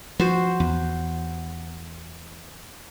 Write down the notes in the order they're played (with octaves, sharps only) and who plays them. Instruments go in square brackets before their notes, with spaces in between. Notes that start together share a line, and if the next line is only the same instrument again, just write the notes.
[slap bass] F3 [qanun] F#4 C5
[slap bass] E2